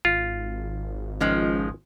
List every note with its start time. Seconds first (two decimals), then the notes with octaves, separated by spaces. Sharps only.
0.05 G#1 F4
1.20 C#2 D#3 F3 G#3